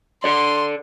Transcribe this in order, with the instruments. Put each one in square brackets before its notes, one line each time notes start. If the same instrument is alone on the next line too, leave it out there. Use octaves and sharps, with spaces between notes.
[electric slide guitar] A4 D5 [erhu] C6